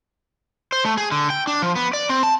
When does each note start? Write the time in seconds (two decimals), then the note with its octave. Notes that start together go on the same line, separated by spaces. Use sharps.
0.72 C5
0.85 A3
0.97 G#4
1.11 D3
1.30 G5
1.47 D4
1.62 F3
1.76 B3
1.93 D5
2.09 C4
2.23 A5